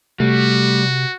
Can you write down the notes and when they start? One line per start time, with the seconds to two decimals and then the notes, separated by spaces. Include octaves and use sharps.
0.20 C3 G3 A3 F#4